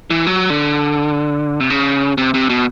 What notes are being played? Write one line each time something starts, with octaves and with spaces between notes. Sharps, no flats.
E3
F#3
D3
C3
C#3
C3
C3
B2